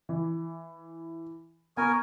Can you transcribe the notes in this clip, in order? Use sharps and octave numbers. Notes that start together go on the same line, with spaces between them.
E3
B3 A#4 G#5 C#6 D#6